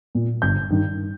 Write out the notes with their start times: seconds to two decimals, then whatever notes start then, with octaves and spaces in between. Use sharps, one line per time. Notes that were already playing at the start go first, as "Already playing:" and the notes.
0.15 A#2
0.42 G1 G6
0.70 G2 D#3